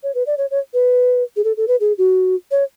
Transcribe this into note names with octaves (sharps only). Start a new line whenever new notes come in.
C#5
B4
D5
C#5
C#5
B4
G#4
A4
A4
B4
G#4
F#4
C#5